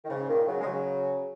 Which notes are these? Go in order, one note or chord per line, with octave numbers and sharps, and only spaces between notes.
D#3
G#2 C#3
A#2 D#3
C#3 F#3
G#3
C#3 F#3